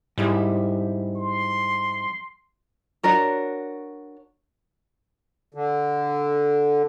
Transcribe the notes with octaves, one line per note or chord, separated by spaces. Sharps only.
F2 G#2 G3 E4
C6
D4 F#4 A#4 C#5
D3